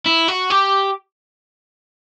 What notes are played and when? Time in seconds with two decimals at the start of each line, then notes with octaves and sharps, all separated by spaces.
0.06 E4
0.28 F#4
0.50 G4